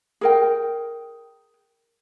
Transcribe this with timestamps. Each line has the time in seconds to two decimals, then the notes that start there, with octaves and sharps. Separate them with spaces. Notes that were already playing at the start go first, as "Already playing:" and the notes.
0.21 G#4 A#4 G5